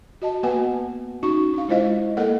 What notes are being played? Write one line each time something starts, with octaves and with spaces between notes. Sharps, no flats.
F#4 D#5 A5
A#3 B3 F#4 B4 F#5 G#5
C#4 D#4 F#4 C#6
D4 F5
G#3 E4 F4 C5 D#5 F5
A#3 A4 A#4 D#5 F#5